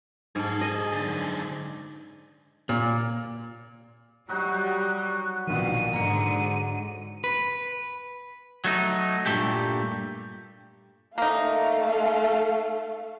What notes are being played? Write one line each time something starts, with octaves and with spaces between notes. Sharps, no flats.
G#2 G#4 A4
D#5
F#2 D3
A#2
F#3 G3 D#4 F#4 F#6
A#1 B2 D#3 E3 D#7
G#2 D3 A#5 C#7
B4
F#3 A3 D#4
G2 A#2 E3 G#3 A3 G4
A3 A#3 D#4 F5